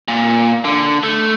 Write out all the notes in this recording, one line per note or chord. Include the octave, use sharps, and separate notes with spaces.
A#2
D3
A3